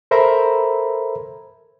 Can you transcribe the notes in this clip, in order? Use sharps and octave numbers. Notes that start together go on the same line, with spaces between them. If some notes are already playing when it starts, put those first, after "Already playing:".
A4 A#4 C5 E5 A#5 B5